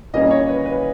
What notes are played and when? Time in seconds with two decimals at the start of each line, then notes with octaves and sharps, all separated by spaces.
0.14 A#2 G3 A#3 C#4 D#5
0.31 C#5
0.49 B4
0.66 B4